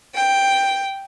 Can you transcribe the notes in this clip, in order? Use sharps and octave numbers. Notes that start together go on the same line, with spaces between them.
G5